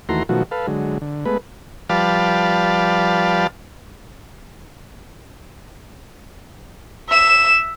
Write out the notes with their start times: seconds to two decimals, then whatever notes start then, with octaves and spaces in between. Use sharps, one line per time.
0.09 D#2 E3 A3 F#4 A#5 C6
0.29 B2 D#3 F3 F#3 A3 F#4
0.51 A4 B4 F5
0.67 D3 F#3 G#3
1.01 D3
1.25 G#3 A3 B3 B4
1.89 F3 G3 B4 D5 F5 A5
7.10 E5 E7